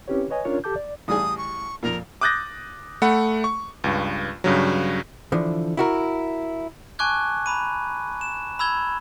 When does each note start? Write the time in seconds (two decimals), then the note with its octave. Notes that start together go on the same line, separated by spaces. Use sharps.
0.08 C4 C#4 E4 G4 B4 C#5
0.30 B4 C#5 D#5 G#5
0.45 C#4 D4 F4 A#4 C#5
0.64 G4 A4 A5 D6 G6
0.76 D5
1.08 A1 G3 G#4 D#6
1.38 C#6
1.83 F2 A#2 A#4
2.21 D6 D#6 F#6 G6 A6 A#6
3.02 A3 F#5 B5
3.44 C#6
3.84 C#2 G2
4.44 G2 C#3 F#3
5.32 D3 E3 F3
5.77 E4 F#4 A#4
6.99 G#5 A5 C#6 D6 F#6 G#6
7.46 A#5 B5 D#7
8.21 E7
8.59 B5 E6 G#6 G7